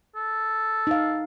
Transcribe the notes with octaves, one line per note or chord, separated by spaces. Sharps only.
A4
D#4 F5